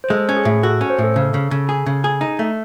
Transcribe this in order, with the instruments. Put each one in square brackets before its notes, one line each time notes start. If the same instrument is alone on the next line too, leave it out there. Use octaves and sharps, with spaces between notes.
[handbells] C5
[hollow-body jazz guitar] G#3 [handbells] A4
[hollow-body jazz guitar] C#4
[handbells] G#4
[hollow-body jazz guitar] A2
[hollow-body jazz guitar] F#4 [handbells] A4
[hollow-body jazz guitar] C#4
[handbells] C5
[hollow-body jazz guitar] A2
[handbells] A4
[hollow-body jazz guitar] C#3 [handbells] A4
[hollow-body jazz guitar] C#3
C#3
G#4
C#3
G#4
D#4
A3